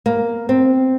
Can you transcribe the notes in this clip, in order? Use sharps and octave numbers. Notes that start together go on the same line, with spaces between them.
A#3
C4